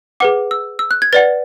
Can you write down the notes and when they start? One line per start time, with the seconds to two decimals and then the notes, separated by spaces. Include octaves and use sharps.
0.20 G#4 B4 F#5 D6
0.51 E6
0.79 E6
0.91 F#6
1.02 G#6
1.13 B4 D5 F#5 A6